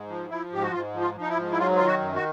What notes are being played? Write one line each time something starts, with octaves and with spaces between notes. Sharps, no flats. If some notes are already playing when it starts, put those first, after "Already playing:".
Already playing: G#2
F3
F3 E4
G#2 G4
F#4
G#2 F4
F3
F4
F3
D#4
E4
G#2
E4
F#3 F4
D#3 F4
F#4
F#2
F#4